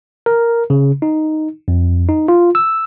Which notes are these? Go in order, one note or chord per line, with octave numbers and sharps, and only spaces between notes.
A#4
C#3
D#4
F2
D#4
F4
E6